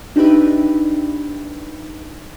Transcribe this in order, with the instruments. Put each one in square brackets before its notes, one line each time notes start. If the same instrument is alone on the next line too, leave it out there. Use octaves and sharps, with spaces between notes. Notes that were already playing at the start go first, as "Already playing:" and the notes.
[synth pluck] D4 D#4 G4 B4 E5